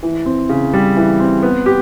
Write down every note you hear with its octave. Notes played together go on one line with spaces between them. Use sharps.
E3
C4
C#3
G3
E3
C4
B3
G4